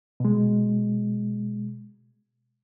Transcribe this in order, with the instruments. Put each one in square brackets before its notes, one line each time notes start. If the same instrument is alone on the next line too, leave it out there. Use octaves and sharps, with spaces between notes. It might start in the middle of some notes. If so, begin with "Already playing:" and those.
[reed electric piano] B2 G#3